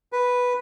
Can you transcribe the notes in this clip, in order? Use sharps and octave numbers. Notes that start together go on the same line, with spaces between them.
B4